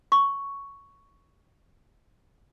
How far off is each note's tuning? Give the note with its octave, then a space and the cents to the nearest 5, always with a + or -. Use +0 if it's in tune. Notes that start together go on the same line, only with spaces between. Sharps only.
C#6 +5